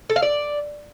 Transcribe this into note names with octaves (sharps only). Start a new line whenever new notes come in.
A4
F5
D5